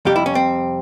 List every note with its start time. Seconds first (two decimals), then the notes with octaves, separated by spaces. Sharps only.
0.05 F2 C3 G3 G4
0.16 E4
0.26 C#4
0.35 C4